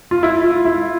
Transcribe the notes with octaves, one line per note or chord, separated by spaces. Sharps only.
F4
E4
F4
E4